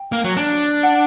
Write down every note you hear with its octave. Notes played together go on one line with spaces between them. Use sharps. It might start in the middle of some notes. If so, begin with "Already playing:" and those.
Already playing: G5
A#3
F#3
D4
F#5